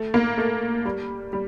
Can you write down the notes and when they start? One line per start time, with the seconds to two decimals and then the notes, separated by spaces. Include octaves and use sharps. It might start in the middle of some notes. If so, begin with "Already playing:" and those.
Already playing: A3
0.14 A#3
0.38 A3
0.85 G3
1.33 G3